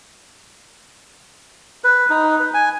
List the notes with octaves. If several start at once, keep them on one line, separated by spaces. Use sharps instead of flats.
B4
D#4
B4
G#5